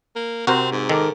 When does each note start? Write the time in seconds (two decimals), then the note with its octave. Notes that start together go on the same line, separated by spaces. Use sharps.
0.16 A#3
0.47 C3 C4 F#4 A#4 C5
0.72 G#2
0.89 D#3 A4 A#4 D6